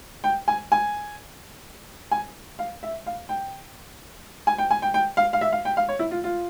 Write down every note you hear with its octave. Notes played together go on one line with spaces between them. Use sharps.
G5
G#5
G#5
G#5
F5
E5
F5
G5
G#5
G5
G#5
G5
G5
F5
F5
E5
F5
G5
F5
C#5
E4
F4
F4